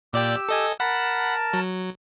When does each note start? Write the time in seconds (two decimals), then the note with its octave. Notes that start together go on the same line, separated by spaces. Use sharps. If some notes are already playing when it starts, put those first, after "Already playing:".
0.13 A#2 G4 D5 G5 E6
0.49 A4 D#5 G#5
0.80 A#4 F#5 A5 B5
1.53 F#3